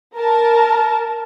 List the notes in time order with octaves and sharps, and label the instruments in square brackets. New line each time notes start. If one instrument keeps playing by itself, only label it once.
[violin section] A#4 A5